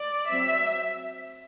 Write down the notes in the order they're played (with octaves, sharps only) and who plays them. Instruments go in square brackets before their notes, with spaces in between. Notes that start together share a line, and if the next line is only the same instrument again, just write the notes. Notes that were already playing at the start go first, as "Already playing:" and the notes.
Already playing: [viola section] D5
F#3 C4 E5